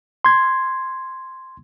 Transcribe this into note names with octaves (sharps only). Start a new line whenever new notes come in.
C6 G#6